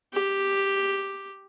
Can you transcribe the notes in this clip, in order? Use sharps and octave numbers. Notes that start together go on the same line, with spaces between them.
G4